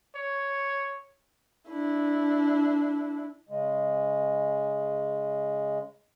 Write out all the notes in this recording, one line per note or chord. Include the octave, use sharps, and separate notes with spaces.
C#5
D4 E4
C#3 G#3